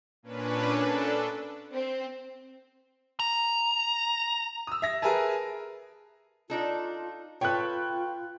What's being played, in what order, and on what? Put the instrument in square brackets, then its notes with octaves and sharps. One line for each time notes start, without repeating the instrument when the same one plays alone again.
[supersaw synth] A#2 C#4 D4 B4
D4 A4
[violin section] C4
[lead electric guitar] A#5
[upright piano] D#6 E6
E5 A#6
G#4 A#4 B4 E5 G#5 A5
[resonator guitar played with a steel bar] D4 D#4 A4 [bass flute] F4
[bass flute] F4 [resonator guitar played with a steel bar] A4 B4 C#5 [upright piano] G5 F#6